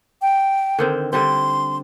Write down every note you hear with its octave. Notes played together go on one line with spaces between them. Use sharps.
G5
D3 D#3 C4
D3 G3 C4 C6